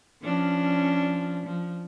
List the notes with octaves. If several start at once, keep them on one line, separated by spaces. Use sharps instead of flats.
F3 C#4 D4
F3